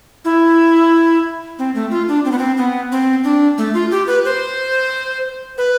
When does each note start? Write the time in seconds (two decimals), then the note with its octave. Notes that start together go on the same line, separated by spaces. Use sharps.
0.25 E4
1.59 C4
1.75 A3
1.91 F4
2.08 D4
2.25 C4
2.32 B3
2.38 C4
2.57 B3
2.92 C4
3.24 D4
3.58 A3
3.74 F4
3.91 G4
4.07 B4
4.25 C5
5.58 B4